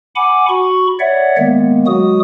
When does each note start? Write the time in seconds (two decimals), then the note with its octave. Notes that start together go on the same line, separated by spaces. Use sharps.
0.15 F#5 G#5 B5 D6
0.49 F#4 B5 C#6
0.99 C#5 D5 E5 F#5
1.38 D#3 G#3 A#3 B3
1.87 F#3 G#3 F#4 D#6